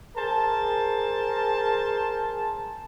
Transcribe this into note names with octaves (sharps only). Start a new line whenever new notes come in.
G#4 A#4 C5 A5